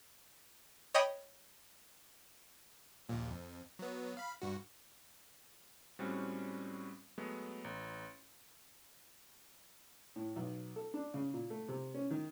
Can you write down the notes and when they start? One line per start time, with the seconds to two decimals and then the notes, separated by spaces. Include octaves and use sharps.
0.94 C#5 D#5 G5 B5 D#6
3.09 A#1 D#2 A#2
3.30 F2
3.79 F#3 B3
4.17 F5 B5
4.42 G2 F#4
5.99 A2 G3 G#3 C4 C#4 F#4
7.18 F#3 G#3 A3 B3
7.64 A1
10.16 A2
10.36 B1
10.76 A4
10.94 D4
11.14 C#3
11.34 A#2
11.50 A3
11.68 C3
11.94 C#4
12.11 D#3